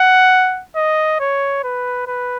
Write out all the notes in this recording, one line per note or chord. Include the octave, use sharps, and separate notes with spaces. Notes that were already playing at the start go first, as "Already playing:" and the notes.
Already playing: F#5
D#5
C#5
B4
B4